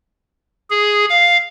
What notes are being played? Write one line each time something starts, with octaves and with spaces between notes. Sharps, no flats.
G#4
F5